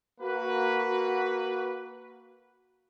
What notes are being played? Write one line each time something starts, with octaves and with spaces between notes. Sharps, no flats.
A#3 F#4 B4